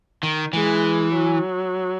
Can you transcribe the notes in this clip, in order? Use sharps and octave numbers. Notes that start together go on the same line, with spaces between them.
D#3
E3 G#3
F#3